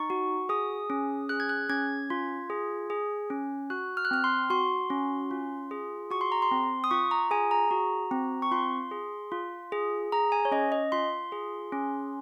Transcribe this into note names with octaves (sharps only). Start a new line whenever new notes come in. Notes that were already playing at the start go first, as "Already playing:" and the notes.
Already playing: D#4 C#6
F#4
G#4 D#6
C#4
G#4 F#6
G#6
F#6
C#4 G#6
F4
G#4
G#4
C#4
F#4 F#6
F6
F#6
C4 F6
C6
F#4 C6
C#4
F4
G#4
F#4 C#6
C6
A#5
C6
C4
D#6
F4 C#6
A#5
G#4 G#5
A#5
F#4
C4
C#6
F4 C6
G#4
F4
G#4
G#4 A#5
G#5
C#5
C#4 D#5
D#5
F4 C6
G#4
C#4